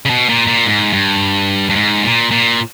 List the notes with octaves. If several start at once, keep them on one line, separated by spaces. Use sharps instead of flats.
C#3
B2
A#2
A#2
G#2
G2
G2
G#2
A#2
A#2